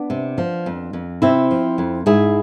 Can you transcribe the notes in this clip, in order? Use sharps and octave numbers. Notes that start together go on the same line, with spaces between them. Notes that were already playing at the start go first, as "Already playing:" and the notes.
Already playing: B3 D4
C3
F3
F2
F2
C3 C4 E4
F3
F2
G#2 E4 G#4